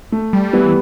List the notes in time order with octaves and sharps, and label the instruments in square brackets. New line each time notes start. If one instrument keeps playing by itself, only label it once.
[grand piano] A3
[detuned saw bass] G3
[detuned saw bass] E3 [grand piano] G3 B3